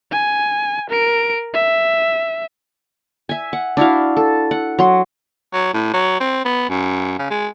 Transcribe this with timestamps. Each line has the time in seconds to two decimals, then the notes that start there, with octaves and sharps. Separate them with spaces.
0.12 G#5
0.90 A#4 D7
1.54 E5
3.29 E5 G#5
3.53 F#5
3.77 D4 E4 F#4 F5
4.17 A4
4.51 F#5
4.79 F#3 C6
5.54 F#3
5.74 A2
5.94 F#3
6.21 C4
6.45 B3
6.70 F#2
7.19 C#3
7.31 G#3